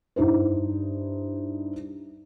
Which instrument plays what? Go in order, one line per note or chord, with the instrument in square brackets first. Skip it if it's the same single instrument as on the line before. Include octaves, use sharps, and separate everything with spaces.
[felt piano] G2 D#4 E4 C5